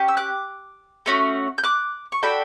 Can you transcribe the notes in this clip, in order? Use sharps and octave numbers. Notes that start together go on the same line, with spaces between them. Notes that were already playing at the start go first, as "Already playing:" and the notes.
Already playing: C#4 G4
E6
D6 F#6
A3 C#4 F#4
G6
D6 F#6
C#6
D4 F#4 A4 G5 B5